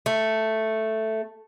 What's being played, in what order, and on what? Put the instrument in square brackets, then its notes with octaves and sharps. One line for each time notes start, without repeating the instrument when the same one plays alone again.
[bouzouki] A3